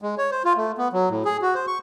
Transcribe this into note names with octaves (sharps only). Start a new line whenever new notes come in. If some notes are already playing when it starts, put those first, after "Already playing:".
G#3
C#5
C5
F4
A3
B3
F#3
A2
G#4
F#4
C5
C#6